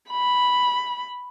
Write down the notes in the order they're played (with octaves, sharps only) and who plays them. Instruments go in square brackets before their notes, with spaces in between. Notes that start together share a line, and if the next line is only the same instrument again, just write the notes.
[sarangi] B5